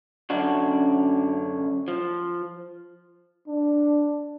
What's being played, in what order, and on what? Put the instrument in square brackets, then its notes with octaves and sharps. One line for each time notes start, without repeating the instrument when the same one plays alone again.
[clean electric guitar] F#2 D3 C#4 D4 F#4
F3
[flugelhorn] D4